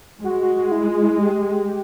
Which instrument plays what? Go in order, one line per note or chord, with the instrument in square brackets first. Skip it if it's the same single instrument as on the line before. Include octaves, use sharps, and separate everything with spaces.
[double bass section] G#3 [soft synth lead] F#4
[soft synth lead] F#4
F#4
E4
F4
E4
G4
G4